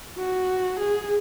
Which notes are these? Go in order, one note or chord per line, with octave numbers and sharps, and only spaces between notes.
F#4
G#4